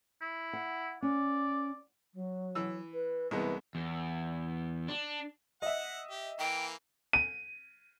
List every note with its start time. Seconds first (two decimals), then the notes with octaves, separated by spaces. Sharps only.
0.22 E4
0.53 F#5
1.02 C#4 D5
2.14 F#3
2.55 E3 E6
2.93 B4
3.31 C2 E3 G#3 B3
3.75 E2
4.88 D4
5.62 D#5 E5 F#5
6.10 G4
6.39 E3 A#3 G5
7.13 D#7